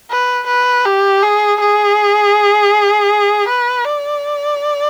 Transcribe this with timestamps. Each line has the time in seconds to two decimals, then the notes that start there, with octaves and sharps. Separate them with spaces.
0.10 B4
0.47 B4
0.86 G4
1.22 G#4
1.60 G#4
3.48 B4
3.85 D5